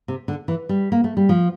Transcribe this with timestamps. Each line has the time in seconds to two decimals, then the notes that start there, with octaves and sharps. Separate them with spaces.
0.08 C3
0.28 D3
0.48 E3
0.69 G3
0.92 A#3
1.04 A3
1.17 G3
1.29 F3